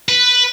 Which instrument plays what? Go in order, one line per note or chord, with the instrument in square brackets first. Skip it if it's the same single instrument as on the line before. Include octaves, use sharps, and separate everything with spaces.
[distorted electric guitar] B4